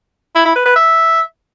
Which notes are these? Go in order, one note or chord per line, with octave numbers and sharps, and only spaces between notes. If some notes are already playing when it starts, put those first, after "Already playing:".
E4
E4
B4
B4
E5